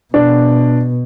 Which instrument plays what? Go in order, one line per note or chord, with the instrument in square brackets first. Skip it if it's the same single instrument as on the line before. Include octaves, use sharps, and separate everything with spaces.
[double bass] B2 [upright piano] D4